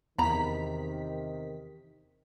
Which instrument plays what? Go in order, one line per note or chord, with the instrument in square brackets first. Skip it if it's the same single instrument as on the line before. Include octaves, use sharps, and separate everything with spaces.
[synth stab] E2 B6 [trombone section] C3 D#3 [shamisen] A#5 B5